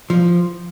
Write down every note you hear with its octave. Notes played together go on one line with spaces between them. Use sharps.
F3